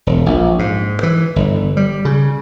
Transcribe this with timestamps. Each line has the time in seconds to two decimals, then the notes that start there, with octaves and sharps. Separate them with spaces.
0.07 E1
0.26 A#1
0.59 G#2
1.03 E3
1.36 G1
1.77 G3
2.05 C#3